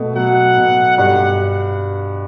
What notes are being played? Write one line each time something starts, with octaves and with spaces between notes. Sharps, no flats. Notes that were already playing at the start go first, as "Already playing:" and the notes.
Already playing: B2 A3
F#3 F#5
B2
G2 F#5